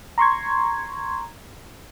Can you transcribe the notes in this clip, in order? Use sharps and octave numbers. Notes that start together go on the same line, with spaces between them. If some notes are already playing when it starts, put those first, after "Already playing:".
A#5 C6 C#6 G#6